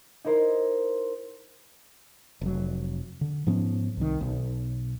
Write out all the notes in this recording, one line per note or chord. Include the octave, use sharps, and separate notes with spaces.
D#4 E4 A#4 C5
F1 F#3
D3
G#2 F3 B3 C#4
C2 D#3
B1